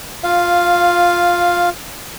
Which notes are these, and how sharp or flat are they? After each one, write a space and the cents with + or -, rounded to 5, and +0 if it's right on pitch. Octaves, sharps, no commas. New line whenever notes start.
F4 +10 F5 +0